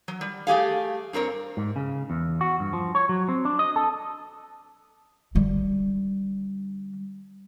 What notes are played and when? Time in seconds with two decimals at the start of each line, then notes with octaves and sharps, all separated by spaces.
0.08 F#3
0.21 G3
0.47 A3 G4 G#4 F5
1.13 G2 C4 A#4 C#5
1.57 G#2
1.76 C#3
2.10 E2
2.41 F#4
2.60 G2
2.73 F3
2.95 C#5
3.09 F#3
3.29 C4
3.45 D4
3.59 D#5
3.76 A4
5.35 D3 G3